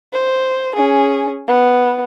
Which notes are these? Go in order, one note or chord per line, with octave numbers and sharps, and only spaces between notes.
C5
C#4 G#4
B3